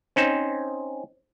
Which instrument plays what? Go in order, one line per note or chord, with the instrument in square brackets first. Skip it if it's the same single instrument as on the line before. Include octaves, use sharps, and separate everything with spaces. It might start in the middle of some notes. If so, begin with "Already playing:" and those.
[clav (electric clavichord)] C4 C#4 D#4 C5